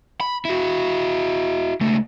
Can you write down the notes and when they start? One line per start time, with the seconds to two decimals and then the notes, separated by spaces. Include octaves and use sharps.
0.20 B5
0.45 E4 F#4
1.81 C#2 A3